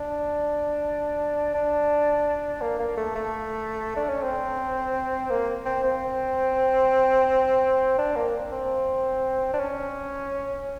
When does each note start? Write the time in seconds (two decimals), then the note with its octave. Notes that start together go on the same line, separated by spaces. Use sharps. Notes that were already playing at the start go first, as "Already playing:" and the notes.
Already playing: D4
1.54 D4
2.61 A#3
2.79 A#3
2.97 A3
3.15 A3
3.96 D4
4.09 C#4
4.23 C4
5.30 A#3
5.65 C4
5.84 C4
7.98 D4
8.16 A#3
8.52 C4
9.54 D4
9.59 C#4